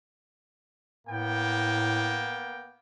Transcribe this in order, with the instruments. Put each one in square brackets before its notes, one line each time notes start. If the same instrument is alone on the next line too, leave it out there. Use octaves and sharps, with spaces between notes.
[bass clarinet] A2 [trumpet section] A#3 B3 G5